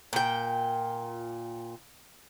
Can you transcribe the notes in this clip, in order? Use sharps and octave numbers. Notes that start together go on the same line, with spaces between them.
A#2 G5